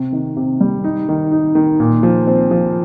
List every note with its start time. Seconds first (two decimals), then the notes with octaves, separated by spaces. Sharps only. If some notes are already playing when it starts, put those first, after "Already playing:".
Already playing: C3
0.13 D#3
0.37 C3
0.60 G3
0.84 D#4
1.09 D#3
1.32 D#4
1.55 D#3
1.80 A#2
2.03 F3
2.27 C4
2.51 F3